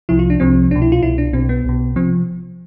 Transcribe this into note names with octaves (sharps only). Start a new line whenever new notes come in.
C2 C3 F3 E4
F4
D4
C2 C3 F3 C4
C2 B2 D4
E4
F4
C2 B2 E4
D4
B1 B2 C4
B3
B1 B2
C3 F3 C4